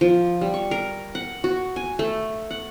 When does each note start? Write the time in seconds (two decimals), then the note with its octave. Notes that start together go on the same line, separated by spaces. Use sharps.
0.01 F3
0.41 G3
0.54 C#6
0.71 A#4
1.15 F#5
1.44 F#4
1.76 G#5
1.99 A3
2.51 F#5